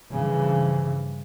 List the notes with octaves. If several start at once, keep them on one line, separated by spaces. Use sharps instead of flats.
G2 C#3 E3 F3